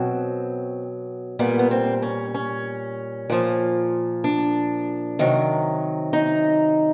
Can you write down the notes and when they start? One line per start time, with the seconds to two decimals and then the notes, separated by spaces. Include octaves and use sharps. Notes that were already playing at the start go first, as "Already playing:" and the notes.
Already playing: B2 F#3 C4
1.39 A#2 G3 B3
1.59 B3
1.71 C4
2.02 C#4
2.34 C#4
3.30 A#2 F3
4.24 D4
5.19 C3 D#3 F#3
6.13 D#4